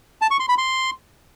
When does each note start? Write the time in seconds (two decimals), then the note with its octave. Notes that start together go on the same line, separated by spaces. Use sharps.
0.22 A5
0.31 C#6
0.40 C6
0.49 B5
0.58 C6